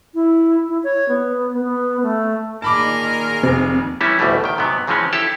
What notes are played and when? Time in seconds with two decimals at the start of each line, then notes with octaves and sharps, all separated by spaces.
0.14 E4
0.68 E4
0.83 C#5
1.08 B3
1.61 B3
2.03 A3
2.62 A#2 D#3 G#4 A#4 A5 B5 D6
3.43 F1 C3
4.01 E3 G3 C#4 E4
4.19 A1 D2 B2 G3 A3
4.44 D#3 G5
4.58 G#2 C3 F#3 B3
4.88 C#3 E3 F3 G#3 C4 C#4
5.13 E4 G4 A4 A5